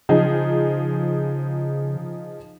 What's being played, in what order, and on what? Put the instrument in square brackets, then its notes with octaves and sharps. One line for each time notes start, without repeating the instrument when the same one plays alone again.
[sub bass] C#3 [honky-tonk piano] F3 D#4 G#4